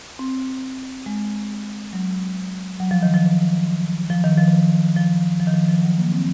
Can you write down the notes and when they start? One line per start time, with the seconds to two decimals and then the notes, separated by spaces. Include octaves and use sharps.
0.19 C4
1.06 G#3
1.93 F#3
2.80 F#3
2.91 F3
3.03 D#3
3.14 F3
4.10 F3
4.24 D#3
4.37 F3
4.97 F3
5.40 F3
5.47 D#3
5.54 F3
5.68 F3
5.83 F#3
5.98 A#3
6.12 C4